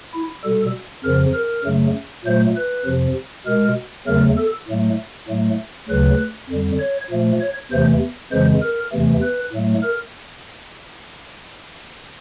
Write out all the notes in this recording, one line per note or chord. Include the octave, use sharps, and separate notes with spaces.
E4
B2 G3 A4
F2 C#3 F3 A#4
A#4
F#2 C#3 F#3 A3
A#2 F#3 A3 C5
B4
F2 C3 F3
B2 G#3 A#4
E2 C#3 F#3 A3 A#4
A4
A2 F#3 A3
A2 F#3 A3
D2 C#3 F#3 B4
F2 D3 G3
C#5
A#2 F3 A3
C#5
E2 C3 E3 A3 C5
F2 C#3 E3 G#3 C5
A#4
E2 C3 E3 A3
B4
A2 F#3 A3
A#4